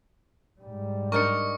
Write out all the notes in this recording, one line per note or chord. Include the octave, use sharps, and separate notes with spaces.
G#2 G3
D4 D#4 A#4 C#6 C#7